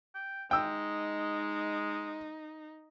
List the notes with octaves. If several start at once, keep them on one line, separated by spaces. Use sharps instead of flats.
G5
G#3 D#4 G5 E6